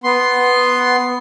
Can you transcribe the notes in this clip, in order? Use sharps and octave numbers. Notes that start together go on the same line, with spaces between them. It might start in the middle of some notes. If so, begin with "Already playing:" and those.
B3 C6